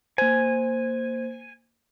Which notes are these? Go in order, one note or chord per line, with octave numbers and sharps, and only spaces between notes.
A#3 C5 G#5